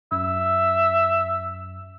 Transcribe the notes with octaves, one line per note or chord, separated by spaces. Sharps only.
F#2 E5